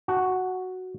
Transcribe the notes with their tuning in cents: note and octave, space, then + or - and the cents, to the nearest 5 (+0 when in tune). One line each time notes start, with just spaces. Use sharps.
F#4 +0 A5 -5